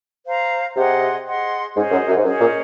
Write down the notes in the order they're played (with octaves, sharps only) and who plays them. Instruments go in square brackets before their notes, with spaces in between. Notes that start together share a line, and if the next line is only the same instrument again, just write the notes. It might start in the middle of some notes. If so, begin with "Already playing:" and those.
[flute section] C5 F5 A#5
[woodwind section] C3 [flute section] G#4 D#5 F#5 C6
[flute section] G#4 D#5 F#5 C6
[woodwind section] G#2 [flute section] C#4 G#4 C5 D#5
[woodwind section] F#2
F#2
G#2
[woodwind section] F#2 [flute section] C#4 G#4 C5 D#5
[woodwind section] A#2